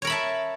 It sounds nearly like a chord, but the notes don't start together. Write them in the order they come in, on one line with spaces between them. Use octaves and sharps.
C#5 A#4 B5 E5 A5